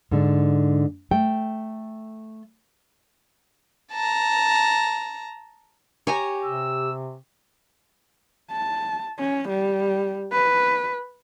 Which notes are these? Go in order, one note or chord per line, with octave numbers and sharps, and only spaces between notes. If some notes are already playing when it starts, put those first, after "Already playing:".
G#2 D3
A3 G5
A5 A#5
G4 C#5 G#5 A#5
C3 E6
A5
C#4
G3
B4